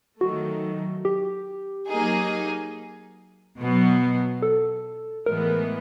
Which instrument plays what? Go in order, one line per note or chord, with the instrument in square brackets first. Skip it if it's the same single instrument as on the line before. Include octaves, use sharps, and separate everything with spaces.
[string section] D#3 F#3 A3 [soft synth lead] F#4
[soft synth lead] G4
[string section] F#3 A#3 D#4 G#4
B2 F#3 B3
[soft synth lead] A4
[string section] A2 E3 G#3 B3 [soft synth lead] A#4